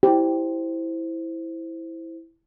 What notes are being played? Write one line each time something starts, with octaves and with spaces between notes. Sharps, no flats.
E4 G4 C5